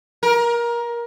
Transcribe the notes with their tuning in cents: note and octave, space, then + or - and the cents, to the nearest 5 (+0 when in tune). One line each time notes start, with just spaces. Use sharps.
A#4 +20